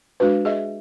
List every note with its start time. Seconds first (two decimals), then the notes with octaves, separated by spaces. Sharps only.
0.20 G#3 D4 F#4 B4
0.45 G#4 D#5 E5